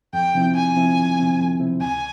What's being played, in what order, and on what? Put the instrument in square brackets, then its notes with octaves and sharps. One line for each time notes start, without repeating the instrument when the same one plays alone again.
[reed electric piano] F2 [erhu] G5
[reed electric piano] C3 F3 C4 E4
[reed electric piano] F2 [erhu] G#5
[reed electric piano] C3 F3 C4 E4
F2
C3 F3 C4 E4
F2
C3 F3 C4 E4
[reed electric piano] C#2 [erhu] G#5